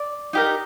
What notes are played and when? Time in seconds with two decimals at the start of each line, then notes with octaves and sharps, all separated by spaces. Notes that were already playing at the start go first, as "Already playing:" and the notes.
Already playing: D5
0.33 D#4 G4 A#4